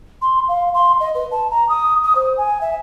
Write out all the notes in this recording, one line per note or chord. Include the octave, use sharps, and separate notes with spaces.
C6
F5
C6
D#5
B4
A5
A#5
D#6
D#6
C5
G#5
E5